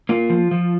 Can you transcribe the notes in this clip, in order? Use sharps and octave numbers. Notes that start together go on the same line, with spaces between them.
A#3 F4
F3
F3